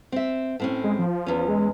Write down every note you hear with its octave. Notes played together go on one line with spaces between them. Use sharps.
C4 E5
A2 C4 C#4
G#3
F3
E2 C#4
G#3